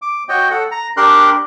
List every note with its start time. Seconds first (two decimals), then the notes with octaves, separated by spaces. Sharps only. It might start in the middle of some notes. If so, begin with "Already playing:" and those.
0.02 D6
0.29 F#4 C#5 D#5 G5
0.51 A4 F#5
0.72 A#5
0.97 D4 G4 A#4 C6 F#6